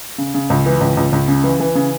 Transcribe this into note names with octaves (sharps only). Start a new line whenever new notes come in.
C#3
C#3
C#2
E3
C#2
C#2
C#2
C#3
E3
E3
C#3